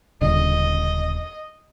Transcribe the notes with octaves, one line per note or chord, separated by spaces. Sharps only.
D#1 C#2 D3 D#5